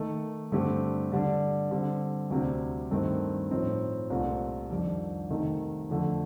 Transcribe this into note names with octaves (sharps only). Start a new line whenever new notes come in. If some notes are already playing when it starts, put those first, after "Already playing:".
Already playing: D#3 A3 D#4
G2 D3 A3 C4 G4
D3 G3 D4
D3 G3 C4
D2 C3 G3 C4
G2 D#3 A3 C4
A2 F3 C4 D#4
C2 A#2 A3 C4 F4
F2 D#3 G3 D4
C3 D#3 A3 D#4
F2 D3 A3